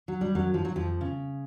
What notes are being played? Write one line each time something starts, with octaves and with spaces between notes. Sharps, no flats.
F#3
G3
F#2 F#3
F3
F#3
F2 F3
C#3